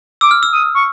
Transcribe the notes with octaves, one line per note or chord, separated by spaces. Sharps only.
D6 E6
F6
E6
D#6
C#6